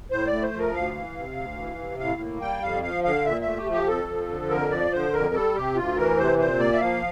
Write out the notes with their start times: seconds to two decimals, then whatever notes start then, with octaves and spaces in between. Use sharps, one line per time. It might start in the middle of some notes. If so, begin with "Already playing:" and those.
0.11 A2 C5
0.27 D5
0.32 A3
0.43 C5
0.53 F3
0.59 A#4
0.74 D2 F5
0.95 E3
1.16 C3
1.37 D2
1.58 E3
1.79 C3
2.00 A2 F5
2.21 A#3
2.41 G3 G5
2.62 F2 F5
2.83 F3 F5
3.04 D3 F5
3.25 A#2 E5
3.41 A3 E5
3.57 G4
3.67 F3 G4
3.87 F2 A4
4.09 F3
4.30 D3
4.51 F2 A#4
4.71 F3 D5
4.92 D3 C5
5.13 F2 A#4
5.34 G3 A4
5.55 C3 G4
5.76 D2 F4
5.97 E3 A#4
6.18 C3 C5
6.38 A#2 C5
6.59 A#3 D5
6.73 E5
6.81 F3 F5